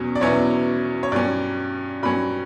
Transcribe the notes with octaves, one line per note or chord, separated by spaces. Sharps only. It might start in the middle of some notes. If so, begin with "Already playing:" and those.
Already playing: E2 B2 F#3 C#4
D5
E2 B2 F#3 C#4 E4 C#5
C#5
G2 F#3 C#4 D5
G2 F#3 C#4 B5